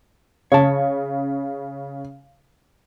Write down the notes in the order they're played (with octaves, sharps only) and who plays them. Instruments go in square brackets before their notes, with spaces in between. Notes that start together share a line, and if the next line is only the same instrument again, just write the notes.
[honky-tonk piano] C#3 [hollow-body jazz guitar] C#5 A5